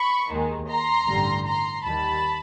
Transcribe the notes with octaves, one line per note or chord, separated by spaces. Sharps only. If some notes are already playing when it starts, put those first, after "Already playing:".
Already playing: B5 C#6
D#2 D#3 G#3
A#5 C6
A1 G2 D3 G3
A#5 C6
D#2 D#3 G3 A5 B5